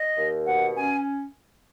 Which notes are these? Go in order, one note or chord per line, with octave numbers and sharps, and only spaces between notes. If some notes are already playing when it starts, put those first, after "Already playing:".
Already playing: D#5
D#2
B2 F#5
C#4 G#5